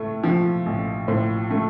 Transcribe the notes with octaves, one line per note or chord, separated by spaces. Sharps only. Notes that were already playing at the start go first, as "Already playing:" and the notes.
Already playing: A2 A3
F3
A1
A2 C5
A3